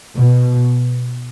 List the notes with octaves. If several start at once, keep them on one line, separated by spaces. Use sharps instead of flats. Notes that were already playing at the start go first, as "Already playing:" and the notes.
B2